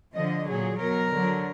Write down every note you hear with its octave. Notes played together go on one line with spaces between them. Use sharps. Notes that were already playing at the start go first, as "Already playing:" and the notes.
D3 F3 D#5
A#2 F#3 G#4
B2 F#3 A#4
D3 F#3